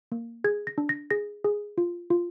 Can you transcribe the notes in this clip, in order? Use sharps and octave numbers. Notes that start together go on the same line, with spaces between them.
A#3
G#4 G#6
A#6
D4
A#6
G#4 A#6
G#4
F4
F4